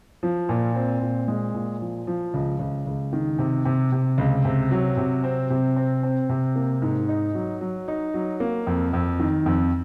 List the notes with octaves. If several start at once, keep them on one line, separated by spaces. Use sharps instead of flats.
F3
A#2
C4
A#2
G#3
A#2
F3
F3
C#2
C#2
C#2
D#3
C3
C3
C3
C#2
C3
F#3
C3
C4
C3
C4
C4
C3
A#3
G#2
D#4
F#3
F#3
D#4
F#3
A#3
F2
F2
D#3
F2